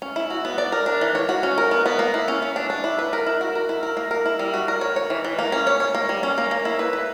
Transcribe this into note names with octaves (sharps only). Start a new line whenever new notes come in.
C#4
E4
F#4
B3
D5
A#4
D4
E3
C#5
F#4
C#4
A#4
B3
B3
A#3
E4
C#4
C#4
D4
D4
E4
B4
A#4
E4
F#4
A#4
E4
A#4
A#3
A#4
E4
G3
F#4
A#4
C#5
C#5
E3
E3
A#3
C#4
C#5
C#5
A#3
G3
C#4
A#3
A#3
E4
B4
B4